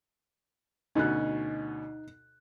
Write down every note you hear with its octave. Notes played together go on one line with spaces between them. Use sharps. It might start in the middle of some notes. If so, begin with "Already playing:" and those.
D2 B2 C#4 D#4 F#6